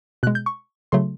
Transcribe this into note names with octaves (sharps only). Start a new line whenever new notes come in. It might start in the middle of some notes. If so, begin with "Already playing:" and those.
B2 G#3 F#6
G6
C#6
C#3 F#3 A3 C6